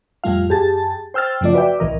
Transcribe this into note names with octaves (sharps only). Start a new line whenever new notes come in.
F2 A2 G3 A3 F4 F5
F#2 G4 G#4 A5 A6
C5 G5 E6 F6 A6
F#2 C#3 F3 A3 F4 D5
F#4 B4 D5 E5 G5
C2 A2 E3 A#4 D#5